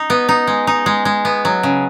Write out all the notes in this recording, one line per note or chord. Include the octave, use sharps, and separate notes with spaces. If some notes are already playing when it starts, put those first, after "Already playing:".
Already playing: D#4
B3
D#4
G#3
D#4
G#3
G#3
B3
F#3
C#3